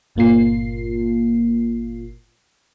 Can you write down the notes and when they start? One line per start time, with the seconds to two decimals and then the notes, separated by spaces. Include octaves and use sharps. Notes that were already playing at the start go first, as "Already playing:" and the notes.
0.15 G1 A#2 A#3 F4 C7